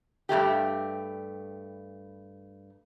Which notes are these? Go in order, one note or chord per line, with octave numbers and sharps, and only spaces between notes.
G2 B2 A3 G4